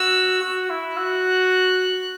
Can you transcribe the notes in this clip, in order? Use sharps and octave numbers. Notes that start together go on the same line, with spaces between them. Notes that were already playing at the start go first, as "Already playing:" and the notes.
Already playing: F#4 E6
F#4
E4
F#4 F#6